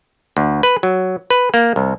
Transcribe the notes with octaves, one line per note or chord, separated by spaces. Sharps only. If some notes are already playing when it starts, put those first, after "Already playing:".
D2
B4
F#3
B4
A#3
C2